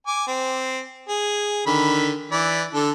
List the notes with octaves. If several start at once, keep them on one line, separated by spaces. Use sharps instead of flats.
G#5 D6
C4
G#4
D3 D#3 B5
E3 D5 B5
D3 A4